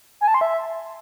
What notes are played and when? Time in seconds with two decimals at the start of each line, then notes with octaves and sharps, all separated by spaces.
0.21 G#5
0.28 A5
0.34 C6
0.41 E5